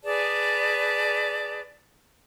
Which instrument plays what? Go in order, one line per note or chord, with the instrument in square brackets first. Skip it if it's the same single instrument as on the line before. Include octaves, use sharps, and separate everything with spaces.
[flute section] G#4 B4 D5 A5